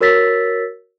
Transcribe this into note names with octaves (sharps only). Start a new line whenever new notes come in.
F#4 A#4 C#5 E6 A6 B6